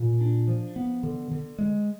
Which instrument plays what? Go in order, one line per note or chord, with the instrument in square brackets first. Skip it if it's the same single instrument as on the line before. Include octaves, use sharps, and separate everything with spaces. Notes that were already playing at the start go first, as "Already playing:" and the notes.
Already playing: [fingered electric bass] A#2
D4
F3
B3
D3
D3
G#3